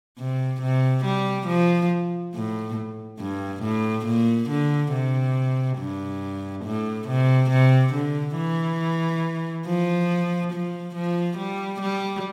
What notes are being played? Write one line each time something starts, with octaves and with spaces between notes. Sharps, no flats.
C3
C3
G3
F3
A2
G2
A2
A#2
D3
C3
G2
A2
C3
C3
D3
E3
F3
F3
F3
G3
G3